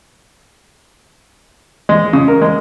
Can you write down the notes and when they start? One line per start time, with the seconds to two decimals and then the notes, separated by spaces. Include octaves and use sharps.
1.89 G#3
2.13 C#3
2.28 A#4
2.42 G#3